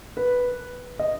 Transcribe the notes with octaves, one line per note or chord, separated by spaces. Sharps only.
B4
D#5